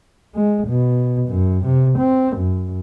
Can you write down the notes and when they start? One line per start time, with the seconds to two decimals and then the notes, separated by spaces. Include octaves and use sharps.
0.35 G#3
0.68 B2
1.29 F#2
1.65 C3
1.99 C4
2.37 F#2